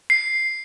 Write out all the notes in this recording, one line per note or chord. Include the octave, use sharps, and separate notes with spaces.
C7